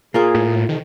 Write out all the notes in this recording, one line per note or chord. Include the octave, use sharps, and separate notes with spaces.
A#3 F4 G#4 A#4
A2
F2 C3 D#3 F3